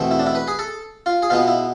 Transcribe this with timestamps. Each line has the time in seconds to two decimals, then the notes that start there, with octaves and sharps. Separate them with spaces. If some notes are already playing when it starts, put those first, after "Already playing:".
Already playing: E2 B2 A3 C4
0.11 E4
0.19 D4
0.27 E4
0.35 B4
0.48 G#4
0.59 A4
1.06 F4
1.22 G#4
1.30 B2 G#3 B3 F4
1.48 E4